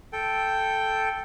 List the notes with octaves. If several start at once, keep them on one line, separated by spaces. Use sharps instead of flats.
A4 G5